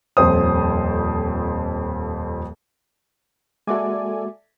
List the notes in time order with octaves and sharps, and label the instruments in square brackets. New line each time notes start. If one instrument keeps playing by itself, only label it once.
[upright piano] D#1 F2 C5 D#6
[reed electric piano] G#3 A#3 F#4 [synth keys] A4 D5 G#5 [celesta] E5 D6